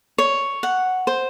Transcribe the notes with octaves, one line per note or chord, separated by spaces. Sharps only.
C#5
F#5
C5